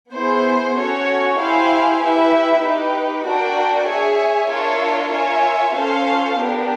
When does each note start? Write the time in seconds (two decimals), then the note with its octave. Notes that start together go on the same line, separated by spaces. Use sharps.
0.13 B3 E4 G#4 C5
0.76 C#4 F#4 A4 C#5
1.37 E4 G4 C5 F5 G#5
2.00 E4 G4 B4 E5
2.62 D#4 G4 B4
3.24 D4 F#4 A#4 D5 G5
3.87 G#4 C#5 E5 G#5
4.49 D4 F4 A#4 C#5 E5
5.11 F4 A#4 C#5 E5 G#5
5.74 C#4 F4 A4 C5 F5
6.37 B3 D4 G4 A#4